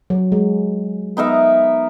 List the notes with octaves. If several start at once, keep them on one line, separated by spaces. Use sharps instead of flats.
F#3
G#3
B3 D#4 A#4 E5